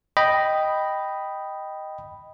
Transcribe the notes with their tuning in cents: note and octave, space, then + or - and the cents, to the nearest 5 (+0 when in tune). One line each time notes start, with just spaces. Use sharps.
D#5 +0 G5 -5 B5 +0